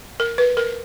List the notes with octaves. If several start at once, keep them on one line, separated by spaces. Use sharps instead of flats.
A#4
B4
A#4